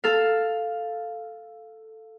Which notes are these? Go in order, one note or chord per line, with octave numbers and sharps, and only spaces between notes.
A4 F5